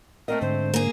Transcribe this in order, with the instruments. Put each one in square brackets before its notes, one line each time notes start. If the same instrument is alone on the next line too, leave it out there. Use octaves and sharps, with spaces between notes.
[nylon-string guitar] A3 C4 D#5 [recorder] A#4
[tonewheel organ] G#2 D3 [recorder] C5
[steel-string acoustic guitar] A#3 G#4